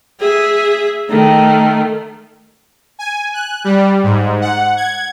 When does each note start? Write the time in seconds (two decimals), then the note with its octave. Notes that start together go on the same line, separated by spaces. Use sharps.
0.20 G#4 E5
1.08 D#3 A3
2.99 G#5
3.34 F#6
3.64 G3
4.03 G#2
4.41 F#5
4.77 G#6